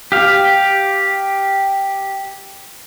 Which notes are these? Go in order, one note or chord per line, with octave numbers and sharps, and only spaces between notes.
G4 F5